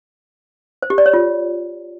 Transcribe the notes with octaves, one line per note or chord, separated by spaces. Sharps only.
C5
G4
D5
C#5
F4